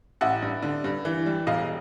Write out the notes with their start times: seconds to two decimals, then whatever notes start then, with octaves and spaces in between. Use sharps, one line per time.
0.21 A1 E5 F#5
0.42 G2
0.63 D3
0.84 G2
1.05 E3
1.26 G3
1.47 E1 D#5 F5